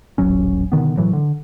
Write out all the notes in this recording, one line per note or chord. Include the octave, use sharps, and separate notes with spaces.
D#1 A1 F#3 C#4
B2 D3 D#3 B3
A2 E3 F#3
D3